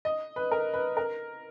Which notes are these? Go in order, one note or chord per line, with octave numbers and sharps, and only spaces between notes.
D#5
B4
A#4
B4
A#4